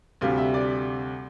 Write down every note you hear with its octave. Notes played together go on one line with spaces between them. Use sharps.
D2 C3 G3 F5
E5
D5